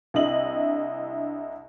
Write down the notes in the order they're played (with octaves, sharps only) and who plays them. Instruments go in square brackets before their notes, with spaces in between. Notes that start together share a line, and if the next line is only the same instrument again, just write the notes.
[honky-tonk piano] C2 D4 E4 D#5 F#7